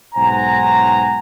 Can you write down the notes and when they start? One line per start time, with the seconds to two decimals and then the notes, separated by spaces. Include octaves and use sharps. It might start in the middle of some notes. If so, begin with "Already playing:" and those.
0.15 B1 G#2 C5 F#5 G#5 A#5